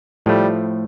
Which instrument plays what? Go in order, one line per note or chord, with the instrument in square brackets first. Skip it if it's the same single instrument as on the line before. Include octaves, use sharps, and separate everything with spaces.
[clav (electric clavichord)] A2 F3 A3 [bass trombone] G3